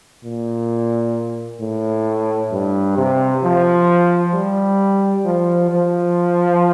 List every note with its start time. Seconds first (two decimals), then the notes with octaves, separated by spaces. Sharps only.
0.24 A#2
1.61 A2
2.52 G2
2.98 C3
3.43 F3
4.34 G3
5.25 F3
5.71 F3